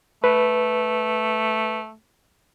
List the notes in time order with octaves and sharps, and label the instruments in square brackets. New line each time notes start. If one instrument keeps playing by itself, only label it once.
[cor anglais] A3 [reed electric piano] B4